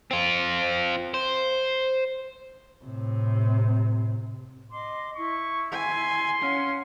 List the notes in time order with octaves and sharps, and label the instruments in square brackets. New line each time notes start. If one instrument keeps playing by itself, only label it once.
[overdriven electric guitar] C4 F4
C5
[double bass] A2 C3
[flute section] D#5 C6 D6
[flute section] E4 [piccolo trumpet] C#6
[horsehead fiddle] G#5 [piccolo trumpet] C6
[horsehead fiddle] C#4 [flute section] F5 F#5